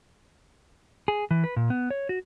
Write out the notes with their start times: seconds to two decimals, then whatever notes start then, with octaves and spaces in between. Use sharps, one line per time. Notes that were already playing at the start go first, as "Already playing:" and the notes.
1.08 G#4
1.31 E3
1.44 B4
1.56 A#2
1.70 B3
1.90 C#5
2.09 F#4